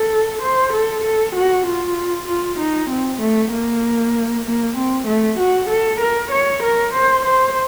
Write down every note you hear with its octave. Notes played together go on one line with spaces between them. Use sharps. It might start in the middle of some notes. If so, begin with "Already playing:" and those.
Already playing: A4
C5
A4
A4
F#4
F4
F4
D#4
C4
A3
A#3
A#3
C4
A3
F#4
A4
A#4
C#5
A#4
C5
C5